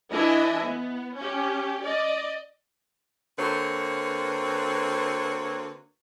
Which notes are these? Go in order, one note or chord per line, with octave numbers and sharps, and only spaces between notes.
E3 D4 E4 D#5 E5 G#5
B3
C#4 G4
D5 D#5
D3 A#3 C4 F#4 B4 C#5